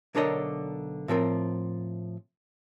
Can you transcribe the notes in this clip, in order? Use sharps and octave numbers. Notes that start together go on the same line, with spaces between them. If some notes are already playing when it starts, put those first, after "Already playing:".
B1 D3 D4 A#4 C#5 D#5
A2 F3 C4 A#4